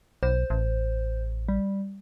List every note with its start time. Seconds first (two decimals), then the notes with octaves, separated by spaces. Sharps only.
0.23 B1 C5
0.50 A1
1.49 G3